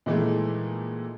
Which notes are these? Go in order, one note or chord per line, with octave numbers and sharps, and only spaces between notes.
A#2 D#3 E3 G#3 A3